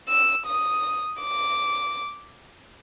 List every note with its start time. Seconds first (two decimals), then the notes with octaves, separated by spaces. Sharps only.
0.09 E6
0.46 D#6
1.22 D6